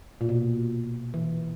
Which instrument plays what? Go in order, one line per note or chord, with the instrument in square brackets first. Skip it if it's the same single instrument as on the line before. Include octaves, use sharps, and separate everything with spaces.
[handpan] A#2
B2
E3